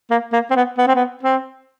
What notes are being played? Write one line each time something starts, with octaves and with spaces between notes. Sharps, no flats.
A#3
A#3
C4
B3
B3
C4
B3
C4